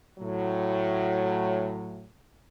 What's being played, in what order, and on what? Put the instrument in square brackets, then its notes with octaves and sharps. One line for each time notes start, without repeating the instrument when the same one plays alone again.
[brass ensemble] A2 F#3